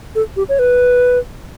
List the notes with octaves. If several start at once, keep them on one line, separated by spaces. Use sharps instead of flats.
A4
G4
C#5
B4